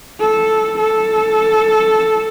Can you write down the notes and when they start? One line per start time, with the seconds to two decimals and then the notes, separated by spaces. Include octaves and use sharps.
0.20 A4
0.79 A4